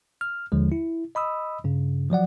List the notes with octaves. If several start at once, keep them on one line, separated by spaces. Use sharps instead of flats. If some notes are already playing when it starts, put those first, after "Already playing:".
F6
D#2 D3 F3 G#3
E4
D#5 B5 D#6 E6
G2 C#3
F3 F#3 D5 F#5